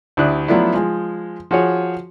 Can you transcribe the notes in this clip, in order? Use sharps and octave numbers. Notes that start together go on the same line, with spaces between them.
D2 E4 G4 D5 D#6 F#6
F3 F#3 A3 B3 D4 E4
F3 G#3
F3 F#4 G#4 C#5